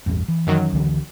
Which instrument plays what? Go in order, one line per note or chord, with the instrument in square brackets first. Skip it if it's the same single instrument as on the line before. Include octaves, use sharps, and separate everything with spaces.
[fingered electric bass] A1 E2 G2
E3
[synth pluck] F#2 D#3 F#3
[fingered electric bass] C#2 D3 E3